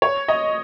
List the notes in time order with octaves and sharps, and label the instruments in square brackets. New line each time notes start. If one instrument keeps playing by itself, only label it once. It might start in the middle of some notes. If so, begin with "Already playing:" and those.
[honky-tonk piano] C#5
D#5